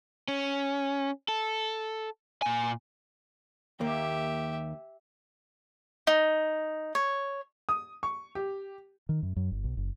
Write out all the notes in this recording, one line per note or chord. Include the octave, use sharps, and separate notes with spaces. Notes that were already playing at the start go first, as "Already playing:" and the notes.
C#4
A4
A#2 G#5
D#2 A#3 G4 E5
D#4
C#5
D#6
C#6
G4
D#3
F#2
F#2
G1
B1
F#1